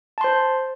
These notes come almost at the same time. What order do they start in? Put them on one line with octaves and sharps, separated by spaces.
A5 C6 C5